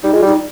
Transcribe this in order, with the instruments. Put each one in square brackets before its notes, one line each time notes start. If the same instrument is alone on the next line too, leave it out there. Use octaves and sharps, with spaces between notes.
[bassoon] G3 [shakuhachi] D#4
[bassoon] G#3 [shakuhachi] F4
[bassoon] G3 [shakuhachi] D#4